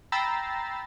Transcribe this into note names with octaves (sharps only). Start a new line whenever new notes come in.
G5 A#5 B5 E6 A6 C7